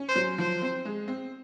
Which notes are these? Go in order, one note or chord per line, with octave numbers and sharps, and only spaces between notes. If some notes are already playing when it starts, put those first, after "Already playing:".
Already playing: C#4
C5
F#3
F3 C5
C4
G#3
C4